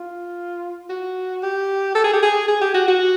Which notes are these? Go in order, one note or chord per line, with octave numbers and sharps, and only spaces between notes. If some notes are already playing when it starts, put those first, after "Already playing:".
Already playing: F4
F#4
G4
A4
G#4
G4
G#4
G#4
G4
F#4
F#4